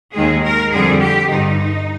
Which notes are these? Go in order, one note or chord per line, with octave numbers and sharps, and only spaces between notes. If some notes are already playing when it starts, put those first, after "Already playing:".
D#2 D#3 G#3 G#4
A#4
F2 D3 G3 G#4
G4
G2 D3 D#4